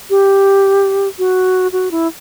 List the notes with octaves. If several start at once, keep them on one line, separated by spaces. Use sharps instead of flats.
G4
F#4
F#4
E4